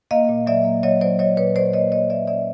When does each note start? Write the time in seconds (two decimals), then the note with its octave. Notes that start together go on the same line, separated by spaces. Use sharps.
0.11 A#3 D#5 F5
0.29 A#2
0.47 F#3 D5 E5
0.65 A#3
0.83 F#3 C#5 D#5
1.01 F#3 C5 D5
1.19 F#3 C#5 D#5
1.37 A#2 B4 C#5
1.55 F#3 C5 D5
1.73 A#3 C#5 D#5
1.92 A#3 C#5 D#5
2.10 F#3 D5 E5
2.28 C#4 D5 E5